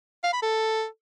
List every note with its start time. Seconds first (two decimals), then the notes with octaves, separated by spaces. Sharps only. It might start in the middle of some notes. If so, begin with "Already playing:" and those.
0.24 F5
0.33 B5
0.42 A4